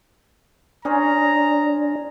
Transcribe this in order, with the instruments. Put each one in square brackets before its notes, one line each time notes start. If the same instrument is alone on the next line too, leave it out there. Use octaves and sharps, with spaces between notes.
[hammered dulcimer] C#4 G#4 C5 [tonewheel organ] D4 [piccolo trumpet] A#5